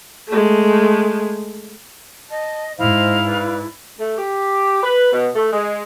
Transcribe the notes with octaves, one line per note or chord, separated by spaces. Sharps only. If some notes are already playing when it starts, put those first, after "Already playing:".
G#3 A3
D#5 A5
G#2 E4 C5 D#5 F5
B4 D5
A3
G4
B4
B2
A3
G#3